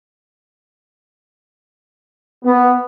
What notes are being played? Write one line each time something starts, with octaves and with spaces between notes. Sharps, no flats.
B3